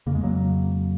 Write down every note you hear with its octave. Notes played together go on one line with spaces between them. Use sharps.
F2 C#3 A#3
G#3
F#3 A#3